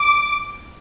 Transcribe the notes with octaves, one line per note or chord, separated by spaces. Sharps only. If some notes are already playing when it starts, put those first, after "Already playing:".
Already playing: D6